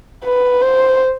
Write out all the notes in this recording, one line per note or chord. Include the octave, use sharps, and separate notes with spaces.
B4
C5